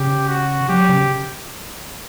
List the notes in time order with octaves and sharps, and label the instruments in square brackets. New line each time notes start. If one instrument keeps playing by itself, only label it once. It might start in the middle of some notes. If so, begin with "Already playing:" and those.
Already playing: [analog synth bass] C#3 [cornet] G4
[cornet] F#4
[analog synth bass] F#3 [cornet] G4
[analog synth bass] C#3